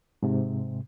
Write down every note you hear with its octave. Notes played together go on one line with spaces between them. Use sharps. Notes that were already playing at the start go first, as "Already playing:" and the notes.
G#2 C3